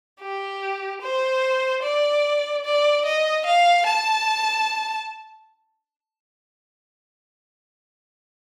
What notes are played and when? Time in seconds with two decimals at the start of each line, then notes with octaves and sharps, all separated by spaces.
0.21 G4
1.01 C5
1.83 D5
2.65 D5
3.06 D#5
3.46 F5
3.86 A5